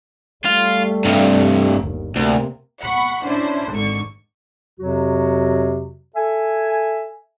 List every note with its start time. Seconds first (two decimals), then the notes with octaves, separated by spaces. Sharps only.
0.45 G3 A3 F4
1.05 G2 C3
1.77 G1 D#2
2.16 D2 C3 A#3
2.81 F#5 B5 C#6
3.23 C#4 D4 E4 C5
3.72 G#1 G#2 D3 C#6
4.79 F2 C3 F#3 F#4
6.16 A4 E5 G#5